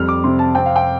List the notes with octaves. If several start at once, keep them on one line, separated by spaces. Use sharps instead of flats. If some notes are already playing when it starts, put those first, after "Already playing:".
Already playing: F2 G3 F6
D6
C3 C6
A5
C4 G5
F5
G5